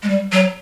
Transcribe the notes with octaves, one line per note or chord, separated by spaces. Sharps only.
G#3
G3
F#3